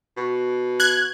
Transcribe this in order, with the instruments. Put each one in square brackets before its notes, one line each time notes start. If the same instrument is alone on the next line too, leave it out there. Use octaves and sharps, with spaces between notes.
[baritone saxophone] B2
[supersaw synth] F#6 G#6